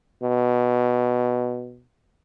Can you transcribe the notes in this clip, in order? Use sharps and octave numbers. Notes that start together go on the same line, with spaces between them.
B2